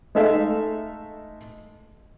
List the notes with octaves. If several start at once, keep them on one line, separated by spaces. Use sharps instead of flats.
G#3 A3 D#4 A4 E5 F5